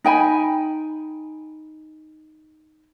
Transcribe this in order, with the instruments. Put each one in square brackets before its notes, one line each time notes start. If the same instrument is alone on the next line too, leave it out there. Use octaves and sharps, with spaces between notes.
[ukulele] D#4 G5 G#5 B5